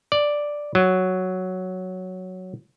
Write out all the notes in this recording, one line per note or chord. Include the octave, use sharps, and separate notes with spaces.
D5
F#3